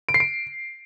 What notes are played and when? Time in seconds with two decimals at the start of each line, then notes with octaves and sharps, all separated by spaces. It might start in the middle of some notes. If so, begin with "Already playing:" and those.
0.09 D7
0.14 C7
0.20 D7